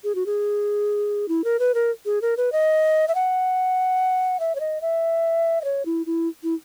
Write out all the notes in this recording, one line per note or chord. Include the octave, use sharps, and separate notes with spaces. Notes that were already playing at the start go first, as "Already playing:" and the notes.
G#4
F#4
G#4
E4
A#4
B4
A#4
G#4
A#4
B4
D#5
E5
F#5
E5
C#5
D#5
E5
D#5
C#5
E4
E4
E4